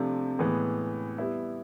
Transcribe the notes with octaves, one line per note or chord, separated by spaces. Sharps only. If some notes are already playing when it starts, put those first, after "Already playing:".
Already playing: C3 F3 A3 D4
A2 E3 G#3 B3
G3 B3 E4